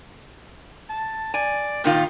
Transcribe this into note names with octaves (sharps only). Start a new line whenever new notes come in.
A5
D5 G#5
A#2 D#3 F4 G5